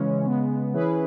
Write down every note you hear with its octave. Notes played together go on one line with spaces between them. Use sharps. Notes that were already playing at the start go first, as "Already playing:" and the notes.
Already playing: C#3 E3 G#3 C#4
C#3 G#3 B3
E3 C#4 E4 G#4 B4